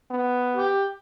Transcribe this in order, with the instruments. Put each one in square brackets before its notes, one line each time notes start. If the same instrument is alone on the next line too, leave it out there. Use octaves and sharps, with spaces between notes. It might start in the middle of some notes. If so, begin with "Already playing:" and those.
[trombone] B3
[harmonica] G4